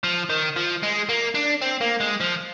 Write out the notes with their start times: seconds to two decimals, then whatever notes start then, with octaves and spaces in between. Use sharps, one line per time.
0.04 F3
0.30 D#3
0.56 F3
0.83 G#3
1.09 A#3
1.35 D4
1.61 C4
1.81 A#3
2.01 G#3
2.21 F3